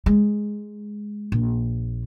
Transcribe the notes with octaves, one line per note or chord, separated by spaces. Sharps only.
G#3
A#1